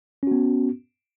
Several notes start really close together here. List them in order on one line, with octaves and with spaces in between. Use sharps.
C#4 F#4 B3